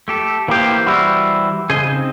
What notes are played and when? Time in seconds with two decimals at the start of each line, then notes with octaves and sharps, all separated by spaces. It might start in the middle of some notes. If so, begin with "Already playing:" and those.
0.08 A3 G4 A4
0.48 E3 A#3 G4 C5
0.86 G3 E4 F#4
1.70 C#3 G#4 C5 D#5
1.87 C4 D#4